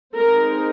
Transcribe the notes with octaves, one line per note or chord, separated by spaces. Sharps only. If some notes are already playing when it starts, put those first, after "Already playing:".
G#3 C4 D#4 A#4